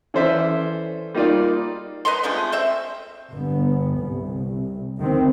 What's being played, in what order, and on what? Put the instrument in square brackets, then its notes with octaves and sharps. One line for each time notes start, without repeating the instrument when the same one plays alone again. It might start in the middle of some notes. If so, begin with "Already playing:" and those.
[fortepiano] E3 C#4 A4 C5 D5 E5
G3 A#3 D#4 F4 D5
[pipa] B4 D#5 A#5 C6
F3 G#3 A3 C4
C4 C5 E5
[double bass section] G1 B3
C2
D2 D#3 C4